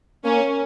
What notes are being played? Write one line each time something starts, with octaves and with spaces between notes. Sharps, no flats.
A#3 C#4